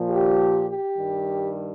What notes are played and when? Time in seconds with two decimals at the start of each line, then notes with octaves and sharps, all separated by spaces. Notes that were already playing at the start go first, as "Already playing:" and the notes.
Already playing: A#2 F3
0.09 G4
0.67 G4
0.97 G2 D#3 G3